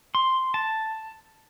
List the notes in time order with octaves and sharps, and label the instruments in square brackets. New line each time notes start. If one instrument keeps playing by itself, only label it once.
[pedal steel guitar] C6
A5